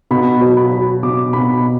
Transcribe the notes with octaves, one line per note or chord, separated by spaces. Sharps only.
B2 B5
F#3
B5
F#3
B2 D6
B2 B5